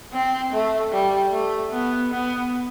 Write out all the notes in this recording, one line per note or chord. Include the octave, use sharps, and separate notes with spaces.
C4
A3
G3
A3
B3
B3